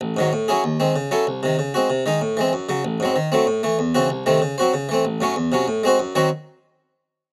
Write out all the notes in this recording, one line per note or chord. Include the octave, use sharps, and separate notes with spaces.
A1
G#2 D#3 F#3
A2
F#3 C#4 E4 G#4
D#2
D#3 G#3 C4
C#3
F#3 C#4 E4 A4
C2
C3 D#3
C#3
G#3 C4 F#4
C3
D#3 G#3 D#4
A2
E3 G#3 C4
F#2
C#3 F#3
A1
G#2 F#3 C4
D#3
F#3 A3 C4
A2
E3 A3
E2
C#3 E3 C4 F#4
C2
C3 D#3 A3 C4
C#3
F#3 C4 F#4 C5
C#3
E3 A3 C4
A1
A2 F#3 A3 C#4
E2
C3 F#3 C#4
A2
G#3 C4 F#4 C5
F#2
D#3 F#3 C4 F#4